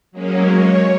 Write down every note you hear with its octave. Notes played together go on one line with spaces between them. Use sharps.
F#3 G#3 A#3 C#4
C#5